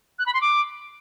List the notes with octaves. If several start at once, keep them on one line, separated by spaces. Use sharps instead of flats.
F#6
B5
C6
D6